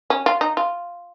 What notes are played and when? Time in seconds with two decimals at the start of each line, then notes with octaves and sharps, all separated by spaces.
0.10 C#4
0.26 F4
0.41 D#4
0.57 F4